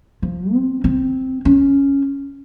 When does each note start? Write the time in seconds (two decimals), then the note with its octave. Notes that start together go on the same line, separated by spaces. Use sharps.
0.22 F3
0.53 C4
0.84 C4
1.45 C#4